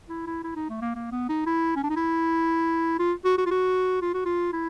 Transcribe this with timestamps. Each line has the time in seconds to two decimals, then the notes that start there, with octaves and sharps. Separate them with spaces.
0.09 E4
0.27 E4
0.44 E4
0.56 D#4
0.70 A3
0.82 A#3
0.95 A#3
1.12 B3
1.29 D#4
1.46 E4
1.76 C#4
1.83 D4
1.90 D#4
1.96 E4
2.99 F4
3.24 F#4
3.38 F#4
3.46 F4
3.51 F#4
4.02 F4
4.14 F#4
4.25 F4
4.53 E4